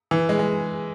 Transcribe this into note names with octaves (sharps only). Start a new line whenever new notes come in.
E3
G#3
G#3